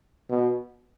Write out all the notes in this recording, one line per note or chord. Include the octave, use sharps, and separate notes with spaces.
B2